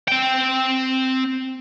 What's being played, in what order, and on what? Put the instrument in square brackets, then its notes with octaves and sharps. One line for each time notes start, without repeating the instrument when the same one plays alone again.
[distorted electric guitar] C4 G5